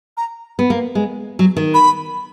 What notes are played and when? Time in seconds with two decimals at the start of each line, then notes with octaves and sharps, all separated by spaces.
0.17 A#5
0.59 B3
0.70 A#3
0.95 G#3
1.39 F#3
1.57 D#3
1.74 B5